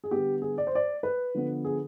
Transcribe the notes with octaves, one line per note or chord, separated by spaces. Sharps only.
G#4
D3 G3 B3 G4
G#4
D5
C5
D5
B4
D3 F3 B3
G#4